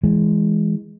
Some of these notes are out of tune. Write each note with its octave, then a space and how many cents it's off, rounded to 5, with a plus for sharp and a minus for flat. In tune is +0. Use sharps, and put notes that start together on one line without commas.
E3 -5 G#3 +0